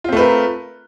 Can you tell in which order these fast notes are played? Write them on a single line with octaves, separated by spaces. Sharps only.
F4 C4 A3 B4 A#4